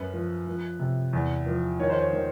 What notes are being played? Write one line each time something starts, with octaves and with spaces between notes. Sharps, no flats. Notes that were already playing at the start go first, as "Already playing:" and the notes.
Already playing: F#2 B4
F3
F3
C3
E2
F3
D#3 C#5
C5
C#5
D#3